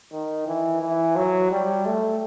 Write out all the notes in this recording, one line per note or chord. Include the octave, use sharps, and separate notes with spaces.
D#3
E3
E3
F#3
G3
A3